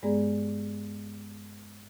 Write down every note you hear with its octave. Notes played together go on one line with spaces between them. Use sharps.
G2 G#3 B3 G#4 D5 A#5